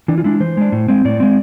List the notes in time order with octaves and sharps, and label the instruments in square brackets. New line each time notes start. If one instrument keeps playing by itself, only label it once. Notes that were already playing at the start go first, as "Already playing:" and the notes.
[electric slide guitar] E3 D4
F4
G#3 D4 E4
E3 C5
G#3 D4
A2
G#3 C4
A2 D5
G#3 C4